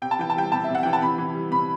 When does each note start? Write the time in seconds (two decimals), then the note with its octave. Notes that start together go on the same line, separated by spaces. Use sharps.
0.02 C3 G5
0.11 A5
0.19 E3 G5
0.30 A5
0.36 G3 G5
0.52 C3 A5
0.64 E5
0.69 C3
0.75 F#5
0.83 E3 G5
0.93 A5
1.01 C3 B5
1.18 E3
1.34 G3
1.51 C3 B5